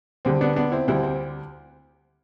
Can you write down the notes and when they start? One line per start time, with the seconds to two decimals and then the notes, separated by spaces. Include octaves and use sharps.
0.25 D2 D3 G3 C4
0.41 B3 D4
0.56 B3 D4
0.72 C4 E4
0.88 D2 D3 G3 C4 E4
1.03 C4